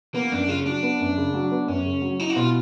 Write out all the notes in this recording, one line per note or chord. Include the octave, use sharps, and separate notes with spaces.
A#3 B3
F#2 D4
C#3 F4
C#4
F#3 D4
B3
F#2
C#3
F#3
B3
F#2 C#4
C#3
F#3
D#4 E4
F#4
B2 F4